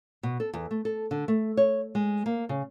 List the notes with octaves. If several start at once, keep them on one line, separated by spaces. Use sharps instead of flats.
B2
A4
E2
A3
A4
D3
A3
C#5
G#3
A#3
C#3